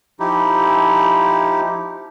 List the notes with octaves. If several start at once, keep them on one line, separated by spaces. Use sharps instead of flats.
F3 D#4 E4 G4